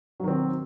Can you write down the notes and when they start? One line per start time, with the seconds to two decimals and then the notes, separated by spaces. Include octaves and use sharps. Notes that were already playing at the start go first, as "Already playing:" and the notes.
0.20 F#3
0.24 D#3
0.28 C4